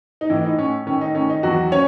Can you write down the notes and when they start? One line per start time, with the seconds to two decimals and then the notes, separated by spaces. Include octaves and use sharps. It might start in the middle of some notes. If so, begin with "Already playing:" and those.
0.21 D#4
0.30 A2 E3 E4
0.44 D#4
0.58 A2 C#4
0.86 D#3 C#4
1.01 D#4
1.15 D#3 C#4
1.30 D#4
1.43 E2 F#3 F#4
1.72 C#4 C#5